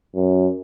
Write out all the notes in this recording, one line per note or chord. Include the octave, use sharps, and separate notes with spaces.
F#2